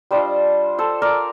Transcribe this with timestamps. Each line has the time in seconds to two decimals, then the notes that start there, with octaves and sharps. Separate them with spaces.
0.11 G3 D4 F4 C5 D#5
0.78 A4 C5
1.02 A#4 D5